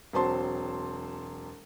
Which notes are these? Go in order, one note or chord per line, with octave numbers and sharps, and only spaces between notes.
E1 F#3 C4 A5 C6